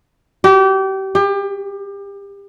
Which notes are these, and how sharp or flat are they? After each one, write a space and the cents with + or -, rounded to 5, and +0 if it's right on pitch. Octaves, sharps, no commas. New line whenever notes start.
G4 -30
G4 +30